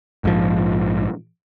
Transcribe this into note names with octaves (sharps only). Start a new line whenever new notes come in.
A#1 G#2 D3 F3